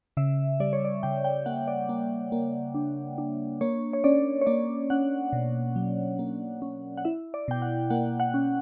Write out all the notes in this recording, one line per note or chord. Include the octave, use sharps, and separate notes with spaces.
C#3 E5
G3 D5
C#5
D5
C#3 G5
G5
A#3 F#5
D5
A#3
A#3
D4
D4
A#3 C#5
C#5
C#4 D5
C#5
A#3 D5
C#4 F#5
B2
F#3
A#3
C#4
F#5
E4 E5
D5
B2 G5
F#5
A#3 F#5
F#5
C#4